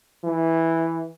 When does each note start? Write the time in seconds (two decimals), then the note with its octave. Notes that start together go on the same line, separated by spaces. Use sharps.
0.24 E3